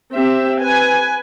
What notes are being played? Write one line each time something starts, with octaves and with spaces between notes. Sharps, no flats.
C4 G4 E5
B4 G#5